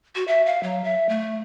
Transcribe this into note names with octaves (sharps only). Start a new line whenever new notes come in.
F#4
E5
F5
F#3
E5
A3